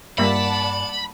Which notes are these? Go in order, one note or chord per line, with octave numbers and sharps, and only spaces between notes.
G2 G3 A#3 D5 E5 F#5 A5 B5